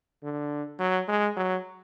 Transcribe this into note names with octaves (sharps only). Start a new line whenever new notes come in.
D3
F#3
G#3
F#3